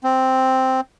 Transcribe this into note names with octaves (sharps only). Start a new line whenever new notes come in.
C4